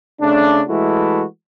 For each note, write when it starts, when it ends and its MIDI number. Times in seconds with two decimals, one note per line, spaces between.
0.21 0.62 49
0.21 0.62 57
0.21 0.62 62
0.69 1.24 52
0.69 1.24 56
0.69 1.24 57
0.69 1.24 64
0.69 1.24 66